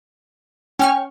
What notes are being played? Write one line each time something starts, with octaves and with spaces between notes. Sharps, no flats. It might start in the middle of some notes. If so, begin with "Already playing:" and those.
C#4 G5 C#6 F6